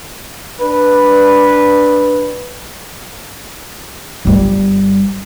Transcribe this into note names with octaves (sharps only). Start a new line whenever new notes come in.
D4 B4
G1 G3